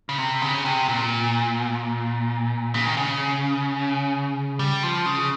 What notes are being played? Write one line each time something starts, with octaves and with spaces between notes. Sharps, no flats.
C#3
C3
C#3
C3
A#2
C#3
D#3
C#3
G3
F3
C#3